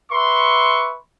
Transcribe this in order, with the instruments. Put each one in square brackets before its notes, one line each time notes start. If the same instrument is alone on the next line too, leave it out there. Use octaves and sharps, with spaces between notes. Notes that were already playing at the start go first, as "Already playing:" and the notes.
[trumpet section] B4 E5 C6 C#6